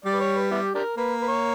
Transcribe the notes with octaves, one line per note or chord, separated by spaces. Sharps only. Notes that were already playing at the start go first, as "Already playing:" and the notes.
G3 D5
B4
C#5
B4
B3 E4 G4
D4 G4 A#4
A#3 B4
B4
C#5